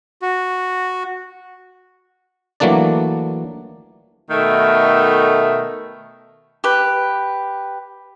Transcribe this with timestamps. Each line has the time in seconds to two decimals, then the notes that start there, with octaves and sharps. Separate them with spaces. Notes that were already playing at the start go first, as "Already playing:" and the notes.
0.22 F#4
2.60 E3 F#3 A3 A#3 D4 D5
4.30 B2 D#3 A3
6.64 G4 B4